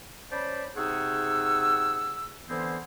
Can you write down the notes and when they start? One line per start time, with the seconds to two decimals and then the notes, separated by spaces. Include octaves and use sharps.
0.32 C#4 C5 D5 A5 B5
0.77 C3 D#4 G#4 F#5 C#6 E6
2.50 D3 E3 B3 C4 E4 C5